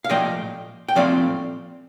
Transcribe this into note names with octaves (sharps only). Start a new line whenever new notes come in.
F5
A#2 F3 A3 D#5 G5
G5
A#2 F3 A3 C4 D5 F5